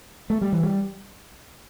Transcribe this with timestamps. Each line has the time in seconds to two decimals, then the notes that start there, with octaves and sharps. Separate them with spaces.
0.30 A3
0.42 G3
0.53 E3
0.63 G3